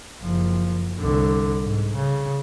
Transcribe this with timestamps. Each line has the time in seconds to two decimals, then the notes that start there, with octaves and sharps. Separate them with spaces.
0.23 F#1 F3
1.00 C2 D3
1.63 G#2
1.95 C#3